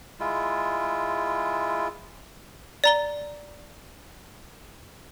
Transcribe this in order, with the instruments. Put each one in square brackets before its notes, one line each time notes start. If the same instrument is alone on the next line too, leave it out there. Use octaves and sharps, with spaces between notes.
[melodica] G#3 E4 F4
[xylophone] D5 A#5 G7